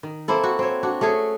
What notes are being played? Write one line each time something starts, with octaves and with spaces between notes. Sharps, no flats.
D#3
A#3 C4 E4 A4
F#4
C4 C#5
D4 F#4
A3 C#4 G#4 C#5